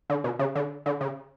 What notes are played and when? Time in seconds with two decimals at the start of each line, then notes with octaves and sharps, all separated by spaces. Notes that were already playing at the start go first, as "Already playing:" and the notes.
0.10 D3
0.24 B2
0.39 C#3
0.55 D3
0.86 D3
1.01 C#3